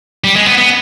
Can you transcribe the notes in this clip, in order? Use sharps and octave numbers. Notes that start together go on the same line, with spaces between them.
G3
G#3
B3
B3